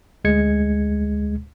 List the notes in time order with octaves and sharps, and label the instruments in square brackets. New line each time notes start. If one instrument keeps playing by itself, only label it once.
[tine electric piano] D2 G#3 G#6 C#7